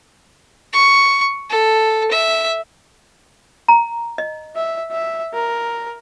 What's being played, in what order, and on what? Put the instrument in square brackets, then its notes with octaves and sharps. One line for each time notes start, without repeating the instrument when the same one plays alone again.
[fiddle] C#6
A4
E5
[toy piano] A#5
D#5
[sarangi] E5
E5
A#4